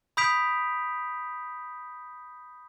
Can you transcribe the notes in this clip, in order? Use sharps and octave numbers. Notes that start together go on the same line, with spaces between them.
B5 D#6 G6 B6 D7 F7